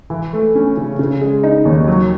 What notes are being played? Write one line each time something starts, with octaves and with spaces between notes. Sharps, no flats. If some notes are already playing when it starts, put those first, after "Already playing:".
E3
A3
C#4
C#3
C#3
G#3
D#4
D#2
F#3